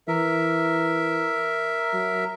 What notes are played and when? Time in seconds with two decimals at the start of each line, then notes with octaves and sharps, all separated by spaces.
0.08 E3 A#4 E5
1.93 F#3